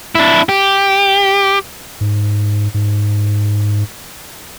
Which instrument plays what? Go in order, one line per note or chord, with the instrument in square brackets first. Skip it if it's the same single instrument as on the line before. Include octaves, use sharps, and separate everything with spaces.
[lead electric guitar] D4 E4
G4
[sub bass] G#2
G#2